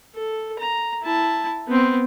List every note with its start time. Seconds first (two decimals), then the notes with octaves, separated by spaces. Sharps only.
0.14 A4
0.59 A#5
1.03 E4 A5
1.68 B3 C4